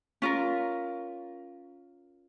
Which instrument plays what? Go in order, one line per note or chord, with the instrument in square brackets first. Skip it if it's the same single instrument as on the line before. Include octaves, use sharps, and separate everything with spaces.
[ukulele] C#4 F4 A#4